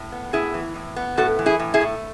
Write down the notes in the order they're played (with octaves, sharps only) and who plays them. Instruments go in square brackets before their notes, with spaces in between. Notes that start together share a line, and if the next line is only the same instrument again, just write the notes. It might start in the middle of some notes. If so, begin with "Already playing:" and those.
Already playing: [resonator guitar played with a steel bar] A2
B3
A2 E4 G#4
E3
A2
B3
A2 F#4 A4
E3
E4 G#4
A2
E4 G#4
A3